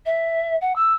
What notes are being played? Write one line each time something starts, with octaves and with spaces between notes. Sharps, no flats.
E5
F#5
E6